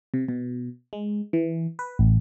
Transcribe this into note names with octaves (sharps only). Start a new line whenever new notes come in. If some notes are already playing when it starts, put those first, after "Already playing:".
C3
B2
G#3
E3
B4
A1